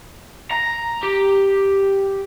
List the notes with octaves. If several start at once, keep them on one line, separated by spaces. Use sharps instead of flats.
A#5
G4